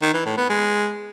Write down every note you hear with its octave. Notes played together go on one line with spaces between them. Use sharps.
D#3
E3
A2
B3
G#3